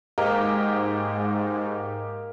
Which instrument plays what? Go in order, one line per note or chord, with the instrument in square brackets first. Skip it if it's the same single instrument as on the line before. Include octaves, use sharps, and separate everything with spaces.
[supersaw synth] G#2 [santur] A#3 [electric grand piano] G4 D#5